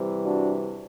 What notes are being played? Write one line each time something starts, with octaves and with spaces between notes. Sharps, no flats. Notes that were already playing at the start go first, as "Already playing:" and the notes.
Already playing: C3 E3 G3
D4 F#4